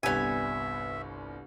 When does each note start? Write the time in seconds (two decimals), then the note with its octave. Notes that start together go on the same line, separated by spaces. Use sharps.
0.03 G1 C2 G3 B3 E5 G#5